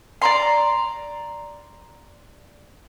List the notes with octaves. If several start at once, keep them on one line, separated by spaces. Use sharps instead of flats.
D5 A#5 C6